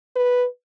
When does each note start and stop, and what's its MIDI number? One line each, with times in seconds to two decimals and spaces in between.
0.16 0.46 71